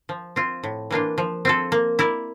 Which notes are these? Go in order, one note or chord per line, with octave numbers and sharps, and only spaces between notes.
F3
C4 F4
A2
E3 A#3 D4 F4
F3
C4 F4 A4
A#3
E4 A#4 D5